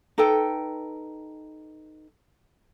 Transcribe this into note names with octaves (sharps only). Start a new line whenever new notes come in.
D#4 A4 B4 G5